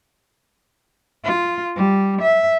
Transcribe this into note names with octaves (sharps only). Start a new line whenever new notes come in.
F4
G3
E5